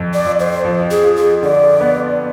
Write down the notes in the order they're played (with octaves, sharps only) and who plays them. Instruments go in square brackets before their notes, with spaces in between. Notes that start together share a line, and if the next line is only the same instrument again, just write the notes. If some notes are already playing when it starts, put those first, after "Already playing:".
Already playing: [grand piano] F2 C4
[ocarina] D5
[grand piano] F3
[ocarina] C5
[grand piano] F3
[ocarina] G#4
[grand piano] F4
[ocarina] G#4
[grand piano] D3 [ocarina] D5
[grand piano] B3